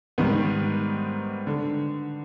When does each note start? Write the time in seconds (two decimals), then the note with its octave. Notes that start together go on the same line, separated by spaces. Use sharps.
0.18 G#2 D#3 G3 B3
1.47 D3